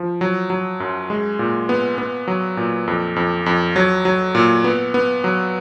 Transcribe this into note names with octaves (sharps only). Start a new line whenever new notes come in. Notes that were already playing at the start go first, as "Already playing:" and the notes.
Already playing: F3
F#3
F#3
F#2
G#3
A#2
B3
B3
F#3
A#2
F2
F2
F2
F#3
F#3
A#2
B3
B3
F#3